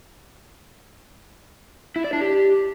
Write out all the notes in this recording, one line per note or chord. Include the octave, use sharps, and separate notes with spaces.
E4
D5
D4
G4